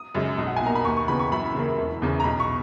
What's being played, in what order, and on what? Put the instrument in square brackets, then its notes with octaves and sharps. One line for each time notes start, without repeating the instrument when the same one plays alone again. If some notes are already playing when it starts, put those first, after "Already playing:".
Already playing: [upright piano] D#6
F#2 C#3 G#3
B1
F#5
G#5
B2 A#3 A#5
B5
D#2 C#6
C#6
C#3 E3 B3 B5
C#6
F#2 B5
C#3 E3 A#3
E1
E2 C#3
A#5
B1 B5
C#6